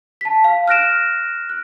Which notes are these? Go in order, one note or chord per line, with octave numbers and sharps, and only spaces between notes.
A5 B6
F5
F6 F#6 A#6 D7 E7
F#6